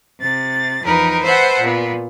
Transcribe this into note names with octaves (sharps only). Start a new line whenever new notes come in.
C3 A6
E2 F3 D#4 A#4 B4
B4 C5 E5 F#5 A5
A#2 B3